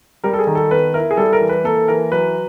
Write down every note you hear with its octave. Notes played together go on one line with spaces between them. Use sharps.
G3 A#4
A4
G#4
D#3
A4
B3 B4
E4 A#4
G#4
G3 A4
A#4
E3
B4
A#3 A4
E3 A#4
F#3 B4